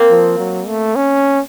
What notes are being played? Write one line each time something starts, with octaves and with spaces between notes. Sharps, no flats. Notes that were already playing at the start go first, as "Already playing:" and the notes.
Already playing: A#3 C4
F3
F#3
A3
C#4